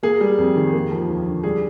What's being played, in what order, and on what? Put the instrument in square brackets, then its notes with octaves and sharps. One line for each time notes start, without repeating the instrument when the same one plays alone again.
[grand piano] A#3 G#4
G3
F2
D#3
A#3
F3
D#2
D3
G3 G#4